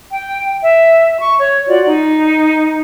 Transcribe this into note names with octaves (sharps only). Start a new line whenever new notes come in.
G5
E5
C#6
C#5
F4 F#4 D5
D#4